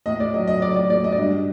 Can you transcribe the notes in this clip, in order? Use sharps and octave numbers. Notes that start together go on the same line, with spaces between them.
A2 D#5
D5
F#3 D#5
D#5
F#3 D5
D5
A2 D5
D#5
D5
G2 D#5